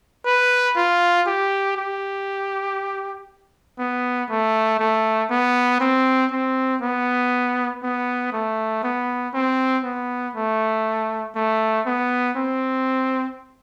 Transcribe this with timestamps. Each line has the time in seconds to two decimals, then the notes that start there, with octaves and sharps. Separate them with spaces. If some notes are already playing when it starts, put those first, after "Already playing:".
0.26 B4
0.76 F4
1.27 G4
1.77 G4
3.79 B3
4.29 A3
4.79 A3
5.30 B3
5.80 C4
6.31 C4
6.82 B3
7.83 B3
8.33 A3
8.83 B3
9.34 C4
9.84 B3
10.35 A3
11.35 A3
11.86 B3
12.36 C4